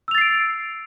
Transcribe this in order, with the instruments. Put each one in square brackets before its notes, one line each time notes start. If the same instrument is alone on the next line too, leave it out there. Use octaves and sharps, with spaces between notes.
[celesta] E6
F7
A6
C7
D7